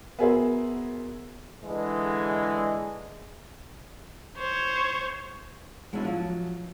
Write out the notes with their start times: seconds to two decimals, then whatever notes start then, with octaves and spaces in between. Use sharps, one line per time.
0.19 B3 F#4 G#4 A#4 C5 E5
1.63 D3 E3 G#3
4.38 C5 C#5
5.93 G#3 B3 C#4 D4 E4 F#4
6.05 F3 F#3